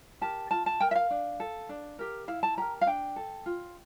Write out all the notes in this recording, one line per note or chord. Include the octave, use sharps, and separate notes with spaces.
G4 A#4 A5
F4 A5
A5
A#4 G5
E5
F5
D4
A4
D4
G4 A#4
E4 F5
A5
G4 A#4 A#5
F5
D4 G5
A4
F4